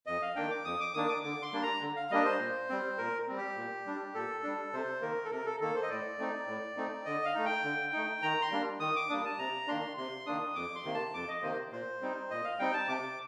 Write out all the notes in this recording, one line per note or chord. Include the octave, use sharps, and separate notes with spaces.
F2 D#5
F5
D#3 A#3 D4 G5
D6
F2 D#6
D6
D#3 A#3 D4 D#6
D6
D3 D6
C6
G3 A#3 D4
A#5
D3
F5
G3 A#3 D4 D#5
C5
A#2
G3 C4
A#2 A#4
G3 C4
G4
A#2
G3 D4
A#2 A4
G3 D4
C3 C5
D#3 A#3 A#4
A4
C3 A#4
A4
D#3 A#3 A4
C5
D#5
A2 D5
A3 C4 D#4
A2
A3 C4 D#4
D3 D#5
F5
A3 D#4
G5
D3
A3 D#4
D#3 A#5
C6
G3 A#3 D4
D#3 D#6
D6
G3 A#3 D4 D#6
A5
C3 A#5
D#3 A#3 D4 C6
C3 C6
D#3 A#3 D4 D#6
F2 D6
C6
C3 D#3 A#3
A5
F2 D6
D#5
C3 D#3 A#3 C5
A#2 C5
G3 C4 D#4
A#2 D#5
F5
G3 C4 D#4 G5
A5
C3 D6